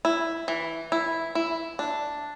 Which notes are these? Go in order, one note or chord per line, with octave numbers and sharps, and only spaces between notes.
E4
E3
E4
E4
D4